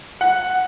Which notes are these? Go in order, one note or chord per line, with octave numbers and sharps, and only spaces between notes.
F#5